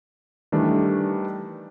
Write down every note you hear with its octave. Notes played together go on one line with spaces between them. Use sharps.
D#3 E3 G3 A3 D4